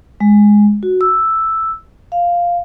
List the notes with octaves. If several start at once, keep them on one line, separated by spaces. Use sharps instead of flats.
G#3
F#4
E6
F5